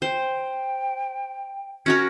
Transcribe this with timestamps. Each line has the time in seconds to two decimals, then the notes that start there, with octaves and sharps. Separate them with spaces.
0.02 C5 G5
1.86 C#4 F#4 A#4 G#6